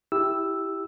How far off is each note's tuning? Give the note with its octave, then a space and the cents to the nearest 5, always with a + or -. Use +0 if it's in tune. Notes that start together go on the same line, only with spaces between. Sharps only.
E4 +0 G4 +0 E6 +0